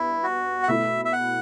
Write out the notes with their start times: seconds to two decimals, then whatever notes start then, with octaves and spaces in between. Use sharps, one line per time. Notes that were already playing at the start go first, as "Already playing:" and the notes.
Already playing: G2 B3 E4
0.23 F#4
0.63 F#5
0.68 B2 A3 E4 E5
1.05 E5
1.13 F#5